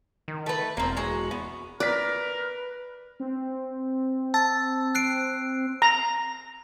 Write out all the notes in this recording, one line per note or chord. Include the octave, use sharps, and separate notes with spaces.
D#3
A3 B4
E1 A#3 C4
G#3 F#4
B3
A#4 B4 D5 F#6 B6
C4
A5 E6 A6
F#6 C7 D7
A#5